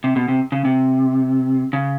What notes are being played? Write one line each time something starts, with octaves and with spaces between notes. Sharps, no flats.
C3
B2
C3
C#3
C3
C#3